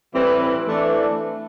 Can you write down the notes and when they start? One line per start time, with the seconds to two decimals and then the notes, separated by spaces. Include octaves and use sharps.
0.14 A2 E3 G3 C4 E4 B4
0.66 E3 A3 D4